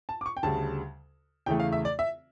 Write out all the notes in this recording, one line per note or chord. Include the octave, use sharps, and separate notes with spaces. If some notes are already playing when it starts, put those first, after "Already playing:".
A5
D6
C#6
G5
D2 C#3 G3 A5
E2 C#3 E3 A3 G5
F5
E5
D5
E5